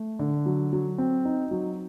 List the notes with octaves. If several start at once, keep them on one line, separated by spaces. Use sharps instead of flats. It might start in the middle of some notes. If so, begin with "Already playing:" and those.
Already playing: A3
D3
F#3
F#3
C4
D#4
F#3